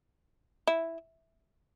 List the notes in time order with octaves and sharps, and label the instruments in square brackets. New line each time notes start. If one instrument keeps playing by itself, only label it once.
[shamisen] E4